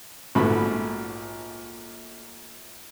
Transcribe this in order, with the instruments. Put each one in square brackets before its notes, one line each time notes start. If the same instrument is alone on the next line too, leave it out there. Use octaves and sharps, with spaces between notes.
[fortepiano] A#1 G#2 A3 F#4 B5